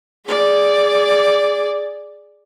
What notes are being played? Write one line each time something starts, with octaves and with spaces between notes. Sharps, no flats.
G#4 D5